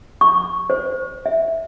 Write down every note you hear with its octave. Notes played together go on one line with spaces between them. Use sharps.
C#6
C5
E5